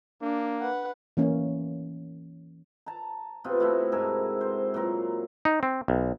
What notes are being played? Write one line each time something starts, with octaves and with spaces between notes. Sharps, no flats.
A#3 D4
B4 F#5
E3 A#3 C#4
A5 A#5
C3 B3 F4
A3 E4 F#4
G#2 A4 A#4 G#5
C5
A#2 F#3 A#4 C6
D#4
C4
B1